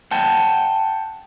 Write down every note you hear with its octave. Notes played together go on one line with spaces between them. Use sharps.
F#5 G5 A5